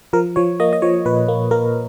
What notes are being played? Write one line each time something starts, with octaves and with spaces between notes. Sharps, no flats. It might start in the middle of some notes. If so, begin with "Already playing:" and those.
F3 A#4
F3 C#5
A#3 D#5
D#5
F3 C#5
A#2 B4
A#3
A#3 A#4